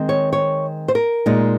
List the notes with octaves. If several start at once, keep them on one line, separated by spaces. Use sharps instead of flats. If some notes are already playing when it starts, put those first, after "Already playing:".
Already playing: D#3 G#3 C4
C#5
C#5
C5
A#4
A#2 G#3 D#4